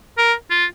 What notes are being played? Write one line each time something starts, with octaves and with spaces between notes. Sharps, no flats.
A#4
F4